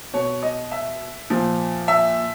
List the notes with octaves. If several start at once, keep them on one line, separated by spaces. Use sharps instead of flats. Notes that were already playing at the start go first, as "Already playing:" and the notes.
B2 C#5
D#5
E5
A#2 F3
E5